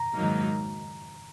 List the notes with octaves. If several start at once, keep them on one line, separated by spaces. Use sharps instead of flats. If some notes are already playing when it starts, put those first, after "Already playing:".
Already playing: A#5
G#2 D#3 F#3 A#3 D#4